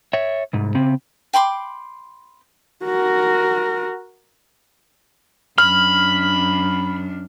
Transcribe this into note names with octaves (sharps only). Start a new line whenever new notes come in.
C#5 E5
C2 G#2
C#3 C4
G5 B5 C6 D6
F#4 A#4
F#2 D4 B5 F6